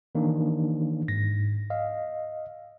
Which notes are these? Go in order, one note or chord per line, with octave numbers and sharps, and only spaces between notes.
D#3 E3 A#3 D4 D#4
G#2 A#6
D#5 F5